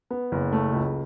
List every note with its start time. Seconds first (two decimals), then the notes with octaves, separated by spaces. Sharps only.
0.10 B3
0.32 F#1
0.52 A3
0.73 C#2